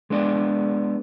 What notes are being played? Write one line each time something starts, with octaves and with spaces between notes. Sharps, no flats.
G#3 B3 D4 D5